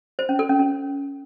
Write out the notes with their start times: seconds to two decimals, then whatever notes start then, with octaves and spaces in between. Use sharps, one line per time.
0.19 C5
0.29 C#4
0.39 A4
0.49 C#4
0.59 C#4